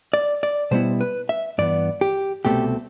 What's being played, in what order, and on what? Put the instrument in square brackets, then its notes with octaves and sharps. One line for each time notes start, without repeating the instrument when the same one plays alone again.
[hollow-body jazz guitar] D5
D5
B2 G3 B3 E4 C5
B4
E5
G2 E3 B3 D5
G4
C2 B2 A3 C4 G4